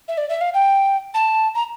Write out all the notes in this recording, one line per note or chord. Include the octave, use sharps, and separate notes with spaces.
E5
D5
E5
F5
G5
A5
A#5